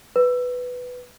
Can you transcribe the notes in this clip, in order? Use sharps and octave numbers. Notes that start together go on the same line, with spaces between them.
B4